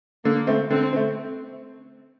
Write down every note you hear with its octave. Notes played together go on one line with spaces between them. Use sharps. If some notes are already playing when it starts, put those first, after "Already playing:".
D3 A#3
A3 C4
D3 C4
A3 C4